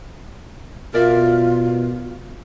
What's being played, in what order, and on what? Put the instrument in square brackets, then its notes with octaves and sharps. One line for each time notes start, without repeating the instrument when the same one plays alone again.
[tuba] B2 [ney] F4 [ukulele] A#4 D5 E5